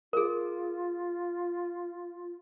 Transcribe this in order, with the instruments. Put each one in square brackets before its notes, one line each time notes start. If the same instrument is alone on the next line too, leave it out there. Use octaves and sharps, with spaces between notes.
[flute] F4 [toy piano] G#4 A#4